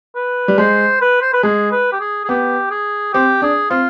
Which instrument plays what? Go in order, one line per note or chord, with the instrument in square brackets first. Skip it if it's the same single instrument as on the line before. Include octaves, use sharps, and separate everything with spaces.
[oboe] B4
[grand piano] G3
[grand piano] G#3 [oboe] C5
[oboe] B4
C5
B4
[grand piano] G#3 [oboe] G#4
[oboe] B4
G4
G#4
G#4
[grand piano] B3 [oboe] G4
[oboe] G#4
[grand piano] C4 [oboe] G4
[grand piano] D4 [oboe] G#4
[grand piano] C4 [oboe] F4